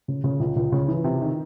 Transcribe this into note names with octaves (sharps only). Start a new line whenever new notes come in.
C#3
C#3
C#2
C#2
C#3
E3
C3
D#3